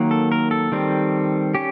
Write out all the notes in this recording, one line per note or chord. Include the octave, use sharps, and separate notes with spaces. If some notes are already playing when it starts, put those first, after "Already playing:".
Already playing: D#3 F#3 A#3
A4
A#4
A4
D#3 G3 C4
C#4 G4